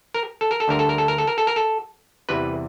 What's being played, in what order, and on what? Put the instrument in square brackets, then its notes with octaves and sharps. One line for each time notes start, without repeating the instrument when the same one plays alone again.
[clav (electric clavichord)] A#4
A4
A#4
A4
D2 D3 G3 A#4
A4
A#4
A4
A#4
A4
A#4
A4
A#4
A4
E2 C3 E3 G3 B4